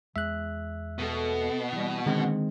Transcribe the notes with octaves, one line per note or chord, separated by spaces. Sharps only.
E2 G#3 E5 F#6
B2 A3 B3 A4
E3 G3
D3 D#3 G#3 C4 A#4